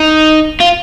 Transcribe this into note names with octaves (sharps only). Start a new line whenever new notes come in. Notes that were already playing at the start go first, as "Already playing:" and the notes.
Already playing: D#4
F4